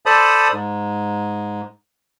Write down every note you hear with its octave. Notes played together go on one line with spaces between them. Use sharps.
A4 C5 D5 A5 B5 D#6
G#2